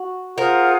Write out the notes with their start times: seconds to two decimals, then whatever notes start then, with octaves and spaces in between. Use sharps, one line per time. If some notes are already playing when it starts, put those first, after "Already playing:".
Already playing: F#4
0.37 F4 G#4 A#4 C5 F#5